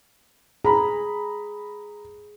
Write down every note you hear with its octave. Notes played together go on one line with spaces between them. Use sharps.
G#4 A#5 B5